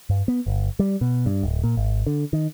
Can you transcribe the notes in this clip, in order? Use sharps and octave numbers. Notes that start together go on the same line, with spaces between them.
G2
B3
G1
G3
B2
G2
D1
A#2
G#1
D3
D#3